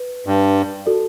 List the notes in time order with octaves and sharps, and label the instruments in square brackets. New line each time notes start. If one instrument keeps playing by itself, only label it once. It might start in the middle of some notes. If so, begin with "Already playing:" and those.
Already playing: [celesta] B4
[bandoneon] G2
[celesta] F#4 A4 D5